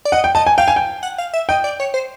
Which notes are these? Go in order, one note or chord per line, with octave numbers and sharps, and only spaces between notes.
D5
D#5 F#5
G5
D#5 A5
G#5
F5 G5
G#5
G5
F#5
F5
E5
D#5 G5
D5
C#5
C5